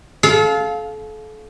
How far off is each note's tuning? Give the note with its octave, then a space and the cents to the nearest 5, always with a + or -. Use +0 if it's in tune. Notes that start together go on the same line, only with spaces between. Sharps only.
A4 -35 F5 +10